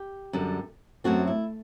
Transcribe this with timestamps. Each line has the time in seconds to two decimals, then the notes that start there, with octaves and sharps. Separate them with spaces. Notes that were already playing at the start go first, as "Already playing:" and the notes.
Already playing: G4
0.33 F#2 D3 G3
1.04 F#2 F#3 A3 C4 F#4
1.27 E4